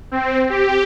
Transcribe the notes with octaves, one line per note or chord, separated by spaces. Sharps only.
C4
G4